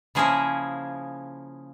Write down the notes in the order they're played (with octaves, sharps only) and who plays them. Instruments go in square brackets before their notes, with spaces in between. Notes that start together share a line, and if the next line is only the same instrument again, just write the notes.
[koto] C#3 F3 A#3 C#4 E4 G#4